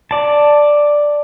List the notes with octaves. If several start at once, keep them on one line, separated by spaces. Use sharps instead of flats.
D5 A5